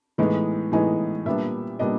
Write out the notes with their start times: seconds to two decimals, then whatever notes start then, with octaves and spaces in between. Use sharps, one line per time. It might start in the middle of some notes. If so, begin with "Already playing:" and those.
0.18 A2 E3 G#3 B3 D#4
0.72 A2 E3 G#3 B3 D#4 G#5
1.26 A#2 G3 B3 D4 E5
1.79 A#2 G3 B3 D4 D#5